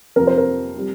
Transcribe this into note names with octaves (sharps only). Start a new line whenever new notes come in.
F2 C3 F3 A#4
C5
A#4
C3 G3